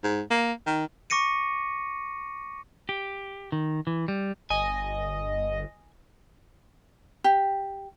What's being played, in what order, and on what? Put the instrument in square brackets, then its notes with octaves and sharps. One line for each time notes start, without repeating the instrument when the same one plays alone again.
[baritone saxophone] G#2
A#3
D#3
[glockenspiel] C#6 D6 A#6 C#7 D#7
[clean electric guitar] G4
D#3
E3
G3
[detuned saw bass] G1 [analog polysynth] D#5 [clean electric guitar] G#5
[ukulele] G4